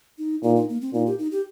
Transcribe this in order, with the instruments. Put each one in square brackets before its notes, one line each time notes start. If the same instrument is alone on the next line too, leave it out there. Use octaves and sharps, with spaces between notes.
[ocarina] D#4
[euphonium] A#2 [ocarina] D#4
[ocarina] D#4
A#3
C4
[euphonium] A#2 [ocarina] D#4
[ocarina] G4
D#4
G4